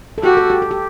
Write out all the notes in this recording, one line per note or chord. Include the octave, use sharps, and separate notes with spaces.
A4
F#4 G4
A4
G4
A4
G4